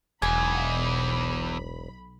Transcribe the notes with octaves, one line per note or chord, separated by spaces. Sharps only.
E1 B1 E2 G#5 B5